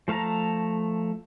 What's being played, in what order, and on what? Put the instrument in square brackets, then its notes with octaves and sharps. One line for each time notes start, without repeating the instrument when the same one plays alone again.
[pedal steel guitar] F3 A3 F5 A5 A#5